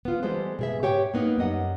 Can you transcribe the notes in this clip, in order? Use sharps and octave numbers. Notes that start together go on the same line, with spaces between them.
B3 F4
E3 G3 G#3 B3 A4 C5
B2 G#4 E5
G#2 G4 C#5 G5
A#3 B3 D#4
F#2 G3 D#5 F#5